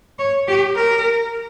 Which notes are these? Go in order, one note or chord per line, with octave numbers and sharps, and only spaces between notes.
C#5
G4
A#4